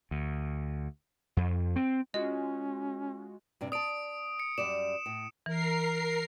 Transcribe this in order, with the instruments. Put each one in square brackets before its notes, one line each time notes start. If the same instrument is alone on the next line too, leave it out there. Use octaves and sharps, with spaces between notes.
[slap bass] D2
F2
C4
[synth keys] G#3 F4 F#4 [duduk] C#4 [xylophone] D#5
[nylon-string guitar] G2 C3 D4
[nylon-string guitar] D5 A5 [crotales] D#6 D7
[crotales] C#7
[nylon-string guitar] F#2 G3 D5 [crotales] E7
[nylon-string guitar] A2
[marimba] E3 [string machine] A#4 C7